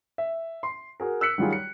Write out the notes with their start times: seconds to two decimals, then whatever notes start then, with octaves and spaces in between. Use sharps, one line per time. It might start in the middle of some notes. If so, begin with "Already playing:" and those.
0.18 E5
0.63 C6
1.00 F#4 G#4 A#4
1.21 E6 F#6 B6 C#7 F#7
1.38 D#3 F#3 G3 F4 G#4
1.53 C#7